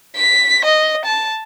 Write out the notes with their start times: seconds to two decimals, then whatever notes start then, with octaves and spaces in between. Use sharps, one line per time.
0.16 B6
0.65 D#5
1.05 A5